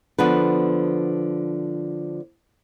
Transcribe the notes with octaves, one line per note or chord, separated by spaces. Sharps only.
D3 F3 B3 D4 B4